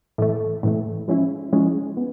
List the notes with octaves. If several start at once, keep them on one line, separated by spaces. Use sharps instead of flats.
A2 E3 A3
A2 E3 A3
F3 G#3 C#4 E4
F3 G#3 C#4 E4
B3